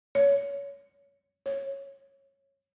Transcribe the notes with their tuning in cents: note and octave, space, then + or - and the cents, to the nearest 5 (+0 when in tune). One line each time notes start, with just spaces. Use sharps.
C#5 +25
C#5 -15